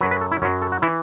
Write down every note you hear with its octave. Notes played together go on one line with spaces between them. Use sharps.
F#2 F#3 B4
B4
A4
E4
F#2 F#3 C#4
A4
F#4
E3 E4